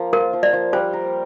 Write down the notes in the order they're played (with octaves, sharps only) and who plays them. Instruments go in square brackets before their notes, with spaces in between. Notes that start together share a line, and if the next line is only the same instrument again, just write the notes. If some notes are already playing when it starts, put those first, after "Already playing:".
Already playing: [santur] F3 A#3
[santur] F4 [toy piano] A#4
[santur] F3
[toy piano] D5
[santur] F3
[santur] G3 [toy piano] C5
[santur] A#4